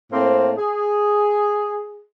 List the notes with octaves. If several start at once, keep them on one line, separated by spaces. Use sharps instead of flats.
A2 A#3 C4
G#4